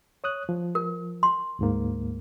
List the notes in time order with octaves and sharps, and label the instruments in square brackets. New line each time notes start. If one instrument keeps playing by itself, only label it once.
[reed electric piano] C#5 D#6 F#6
F3
[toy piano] A#4
C6
[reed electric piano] D2 G#2 A#3